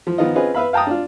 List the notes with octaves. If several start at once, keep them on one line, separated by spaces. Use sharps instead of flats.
F3
D#3 F3 B3 D#4 F4 D#5
C4 C#4 F4 G#4 B4 D#5
B4 E5 F5 B5
F5 G5 A5 A#5 D#6
D4 F4